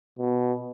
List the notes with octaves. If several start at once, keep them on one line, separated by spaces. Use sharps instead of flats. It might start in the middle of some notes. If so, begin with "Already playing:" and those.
B2